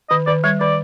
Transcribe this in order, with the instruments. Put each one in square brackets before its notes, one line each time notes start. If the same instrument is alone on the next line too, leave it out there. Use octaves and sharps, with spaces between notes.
[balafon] D#3 [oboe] D#5
[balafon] D#3 [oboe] D5
[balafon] G3 [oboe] C#5
[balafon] D#3 [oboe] D5